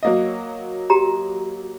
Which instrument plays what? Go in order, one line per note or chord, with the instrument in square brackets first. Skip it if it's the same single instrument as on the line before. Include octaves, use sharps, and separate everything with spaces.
[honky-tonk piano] F#3 A#3 D#5
[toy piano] F#4 G4 A#5